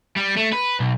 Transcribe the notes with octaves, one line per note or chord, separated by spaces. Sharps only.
G3
A3
B4
B1